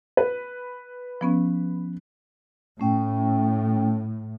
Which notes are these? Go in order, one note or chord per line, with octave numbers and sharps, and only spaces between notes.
B4
F3 B3 C#4
A2 A3 C#4 G5